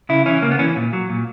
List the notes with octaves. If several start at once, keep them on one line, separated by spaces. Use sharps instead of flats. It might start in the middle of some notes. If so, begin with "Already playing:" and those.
C#3 E4
E3 C#4
C#3 A#3
B3
E3 C#4
A#2
F#3
A#2